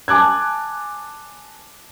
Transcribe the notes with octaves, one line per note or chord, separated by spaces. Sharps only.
G#5 A5 D6 F#6 G#6